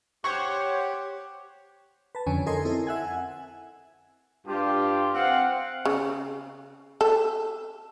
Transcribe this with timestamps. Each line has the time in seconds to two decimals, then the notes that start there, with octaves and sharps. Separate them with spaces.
0.24 G4 C5 C#5 F#5 C#6
2.15 B4 A5
2.27 F2 D3 C#4 G#5
2.46 D#4 A4 A#4 D#5 G#5 C6
2.65 C4 E4 A4
2.87 E5 F#5 G#5
4.47 G2 F4 G4
5.14 C4 F5 F#5
5.85 C#3
7.01 A4